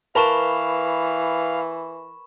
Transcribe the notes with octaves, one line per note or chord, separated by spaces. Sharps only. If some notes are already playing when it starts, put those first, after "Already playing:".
E3 A#4 B4 F5 A5 B5 C#6 E7